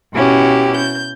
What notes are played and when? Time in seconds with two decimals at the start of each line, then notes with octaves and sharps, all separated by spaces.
0.12 B2 C#4 E4 F#4 G4
0.76 G6